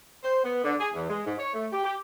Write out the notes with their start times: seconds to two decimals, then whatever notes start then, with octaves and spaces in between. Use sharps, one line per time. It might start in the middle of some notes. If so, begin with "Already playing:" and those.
0.23 C5
0.44 B3
0.63 D3
0.79 G#4
0.94 E2
1.08 G#3
1.25 G#2
1.38 C#5
1.54 A3
1.71 G4
1.84 G4